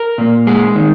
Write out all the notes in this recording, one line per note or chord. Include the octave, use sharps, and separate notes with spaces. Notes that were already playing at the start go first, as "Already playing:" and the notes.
Already playing: A#4
A#2 A#3
G#3 G#4
D#3